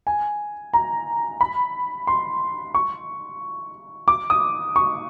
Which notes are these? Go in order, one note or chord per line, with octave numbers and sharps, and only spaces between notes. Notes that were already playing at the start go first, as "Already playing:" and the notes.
G#5
A#5
B5
C6
C#6
D6
D#6
C#6